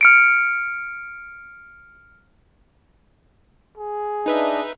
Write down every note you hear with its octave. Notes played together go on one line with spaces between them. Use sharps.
F6 C#7 D7
G#4
D4 D#4 B4 D#5 E5